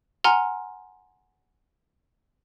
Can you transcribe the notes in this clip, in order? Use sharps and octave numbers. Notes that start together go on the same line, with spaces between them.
F#5 G#5 A#5 C6 F6